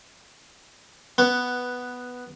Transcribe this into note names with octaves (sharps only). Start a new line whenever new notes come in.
B3